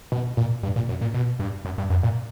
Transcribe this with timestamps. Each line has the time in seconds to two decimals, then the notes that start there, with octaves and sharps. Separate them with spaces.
0.12 B2
0.37 A#2
0.63 G2
0.76 A#2
0.89 F#2
1.01 A#2
1.14 B2
1.39 G2
1.65 F#2
1.78 G2
1.90 F#2
2.03 A#2